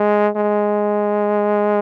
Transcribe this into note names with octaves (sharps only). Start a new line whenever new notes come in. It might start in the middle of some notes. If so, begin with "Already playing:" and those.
Already playing: G#3
G#3